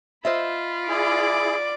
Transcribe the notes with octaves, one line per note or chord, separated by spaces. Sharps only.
F4 C5 D#5 E5 B5
E4 G#4 D5 D6